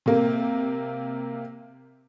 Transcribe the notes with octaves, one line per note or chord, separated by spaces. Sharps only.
C3 A#3